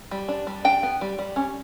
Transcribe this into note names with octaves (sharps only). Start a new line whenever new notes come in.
G3
D4
G3
D4 G5
B3
G3
G3
C#4